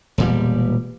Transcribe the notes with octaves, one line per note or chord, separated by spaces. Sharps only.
E1 A#2 G3